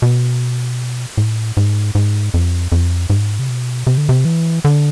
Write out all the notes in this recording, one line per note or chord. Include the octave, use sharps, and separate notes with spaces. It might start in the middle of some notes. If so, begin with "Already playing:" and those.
B2
A2
G#2
G#2
F2
F2
G#2
C3
B2
C3
D3
C3
E3
D3